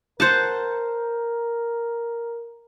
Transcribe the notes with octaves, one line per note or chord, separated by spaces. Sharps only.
A#4 C5 F#5 A5